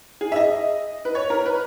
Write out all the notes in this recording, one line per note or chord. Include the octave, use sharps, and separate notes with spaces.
G#4
E5
D#5
B4
C#5
A#4
B4